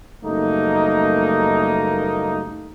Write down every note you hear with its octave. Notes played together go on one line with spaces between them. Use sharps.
F#1 G3 A3 A#3 D#4